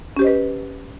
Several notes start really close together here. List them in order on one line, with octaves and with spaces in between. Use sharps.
C#4 G4 C5 D#5 B4